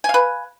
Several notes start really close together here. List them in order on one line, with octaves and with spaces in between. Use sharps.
G#5 F5 B4